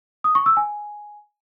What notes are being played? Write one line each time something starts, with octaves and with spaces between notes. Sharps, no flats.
D#6
C#6
E6
G#5